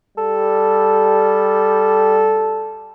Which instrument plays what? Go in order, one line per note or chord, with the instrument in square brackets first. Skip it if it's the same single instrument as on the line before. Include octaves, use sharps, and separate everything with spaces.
[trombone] G3 [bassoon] A4